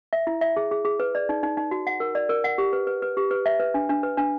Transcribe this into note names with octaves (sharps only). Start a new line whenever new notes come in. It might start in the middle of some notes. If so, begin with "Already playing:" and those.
E5
E4
E5
G#4
G#4
G#4
B4
D5
D#4
D#4
D#4
F#4
F#5
A#4
D5
A#4
F#5
G4
B4
B4
B4
G4
B4
E5
B4
D4
D4
B4
D4